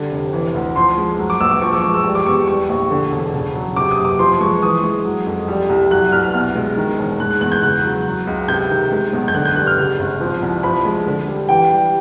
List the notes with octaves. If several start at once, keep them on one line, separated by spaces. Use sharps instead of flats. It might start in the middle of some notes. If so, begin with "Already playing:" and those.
Already playing: D3 G3
F1
E3
D2
F3 C6
G#3
F#3
D6
A#1 E6
D6
F3 C#6
D6
G#3
E6
G3
D6
E2 C#6
G3 C#6
A#1
D3
E1
C#3
F#3
C3 D6
D#6
F#1
D6
F3 C6
G#3 C#6
E3 D#6
G#3
F#3
F2
G3
C2
F#3 F#6
C2 F6
B2 F6
G#3
D#3
E1
G#3 F#6
F#6
E2 F#6
G6
C#3 F#6
F#3
F#3
C#2
C3 G6
D#3
G#3
B1
G6
D3 F#6
G6
G3 F#6
F6
C#3
G#1
F3
C2
F3 B5
G#3
D3
G3
E3 G5
G3